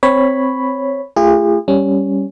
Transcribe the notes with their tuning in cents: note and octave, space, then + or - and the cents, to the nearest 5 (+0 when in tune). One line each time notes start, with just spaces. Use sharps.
C4 -5 C#5 +0 B5 +0
A3 +0 F4 -35 G#4 -40
G3 +0 C#4 +0